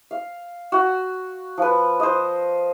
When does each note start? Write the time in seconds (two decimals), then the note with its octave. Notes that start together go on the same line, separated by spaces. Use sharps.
0.11 F5
0.72 F#4
1.58 F3 B4
2.00 C5 D#5